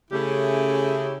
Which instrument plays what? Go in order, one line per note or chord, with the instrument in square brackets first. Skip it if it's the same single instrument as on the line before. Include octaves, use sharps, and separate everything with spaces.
[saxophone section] C#3 A3 C#4 E4 G4 G#4